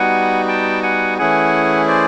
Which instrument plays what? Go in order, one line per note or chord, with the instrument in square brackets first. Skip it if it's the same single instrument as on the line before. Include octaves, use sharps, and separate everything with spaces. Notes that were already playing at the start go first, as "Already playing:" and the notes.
Already playing: [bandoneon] G3 B3 D#4 F#4 [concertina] F#5 G#5
[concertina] G5 A5
F#5 G#5
[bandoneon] E3 A3 C#4 E4 G#4 [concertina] F#5 G#5
[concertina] C5 D5